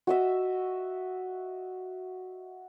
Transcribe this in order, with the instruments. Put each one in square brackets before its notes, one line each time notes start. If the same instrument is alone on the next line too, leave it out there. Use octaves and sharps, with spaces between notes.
[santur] F#4 D#5 E5